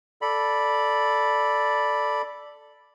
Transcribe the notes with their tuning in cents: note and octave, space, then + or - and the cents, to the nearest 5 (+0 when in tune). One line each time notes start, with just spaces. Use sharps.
A4 +0 D5 +0 B5 -5